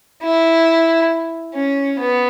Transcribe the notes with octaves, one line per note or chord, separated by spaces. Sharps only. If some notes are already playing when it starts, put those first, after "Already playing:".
E4
C#4
B3